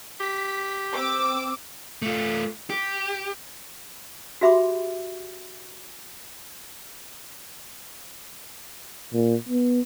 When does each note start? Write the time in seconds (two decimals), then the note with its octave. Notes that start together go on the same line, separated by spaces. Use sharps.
0.20 G4 B6
0.93 C4 D6 E6
2.02 A3 F4
2.70 G4
4.41 F#4 G4 E5 B5 C6 D6
9.13 A#2
9.49 B3